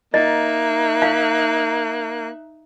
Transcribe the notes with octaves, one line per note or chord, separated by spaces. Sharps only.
A#3 D#4 D#5 E5 F#6
F5